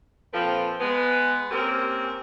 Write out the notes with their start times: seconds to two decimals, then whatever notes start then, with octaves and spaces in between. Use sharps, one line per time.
0.34 A#2 F3 C4 A4 B4
0.80 G#3 B3
1.51 A#3 C4 C#4 G4 A#4